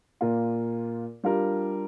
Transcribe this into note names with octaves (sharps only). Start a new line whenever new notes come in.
A#2 A#3 F4 A#4
G3 D4 F4 A#4